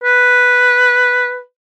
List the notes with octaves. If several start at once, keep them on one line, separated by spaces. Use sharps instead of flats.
B4